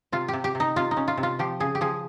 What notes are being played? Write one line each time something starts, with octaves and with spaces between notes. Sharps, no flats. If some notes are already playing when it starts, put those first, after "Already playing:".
C3 F4
G4
C3
G4
C3
D#4
C3 F4
D#4
C#4
F4
C3
F4
F3 G4
C#3 G#4
G4
F3 G#4